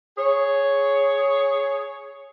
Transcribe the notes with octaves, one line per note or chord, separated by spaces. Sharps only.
G#4 C#5